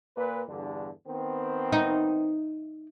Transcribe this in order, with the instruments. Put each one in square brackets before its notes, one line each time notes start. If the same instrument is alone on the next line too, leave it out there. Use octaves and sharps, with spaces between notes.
[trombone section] A#2 B4
E2 G2 D3
D#3 B3 C4
[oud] D#4